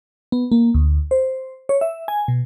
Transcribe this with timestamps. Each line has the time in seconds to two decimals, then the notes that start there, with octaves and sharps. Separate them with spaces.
0.32 B3
0.52 A#3
0.74 D2
1.11 C5
1.69 C#5
1.81 E5
2.08 G#5
2.28 B2